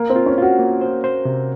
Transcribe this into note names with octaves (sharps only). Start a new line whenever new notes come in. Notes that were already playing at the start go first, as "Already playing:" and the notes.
Already playing: A#3
C4
F4
C#4
F4 F#4
A#3
C5
C5
C3